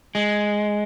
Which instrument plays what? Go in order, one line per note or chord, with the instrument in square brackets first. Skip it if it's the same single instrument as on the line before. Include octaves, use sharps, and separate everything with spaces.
[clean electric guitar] G#3